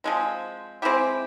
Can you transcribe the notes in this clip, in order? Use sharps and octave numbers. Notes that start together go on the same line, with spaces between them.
F3 G#3 C4
G#3 C4 E4 G4